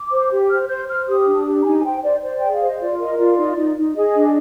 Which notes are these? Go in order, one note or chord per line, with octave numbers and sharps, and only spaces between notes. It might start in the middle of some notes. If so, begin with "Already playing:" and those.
Already playing: D6
C5
G4
C5 F6
C5 G6
C5 F6
G4 D#6
D4
G4
A#5
D#4 G#5
G#5
C5 G5
C5 D5
C5 D5
G#4 G5
F5
C5
D#5
F4 D5
A#4 D#5
F4 D5
D#4
D#4
D#4
G#4 D#5
D4